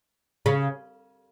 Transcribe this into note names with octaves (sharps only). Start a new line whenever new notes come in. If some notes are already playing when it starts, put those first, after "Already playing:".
C#3